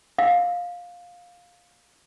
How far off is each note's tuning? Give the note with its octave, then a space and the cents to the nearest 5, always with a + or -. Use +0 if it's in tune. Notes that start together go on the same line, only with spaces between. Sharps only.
F5 +15